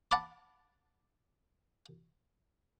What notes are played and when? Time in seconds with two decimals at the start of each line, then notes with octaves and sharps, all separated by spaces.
0.11 F#5 A5 B5 D6